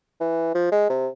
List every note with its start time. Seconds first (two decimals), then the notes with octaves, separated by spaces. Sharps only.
0.21 E3
0.55 F3
0.72 G#3
0.90 C3